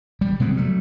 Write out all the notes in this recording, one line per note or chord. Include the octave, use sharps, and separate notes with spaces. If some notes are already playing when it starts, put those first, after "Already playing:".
G3
C3 G#3 B3 C4
F#3 G3 A3